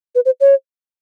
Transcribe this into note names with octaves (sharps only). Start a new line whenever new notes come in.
B4
C5
C#5